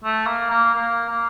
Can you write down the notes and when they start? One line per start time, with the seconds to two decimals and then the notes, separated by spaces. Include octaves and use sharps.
0.04 A3
0.27 A#3
0.51 A#3
0.75 A#3
1.10 A#3